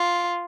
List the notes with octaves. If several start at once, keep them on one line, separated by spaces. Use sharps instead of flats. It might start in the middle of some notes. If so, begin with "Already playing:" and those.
Already playing: F4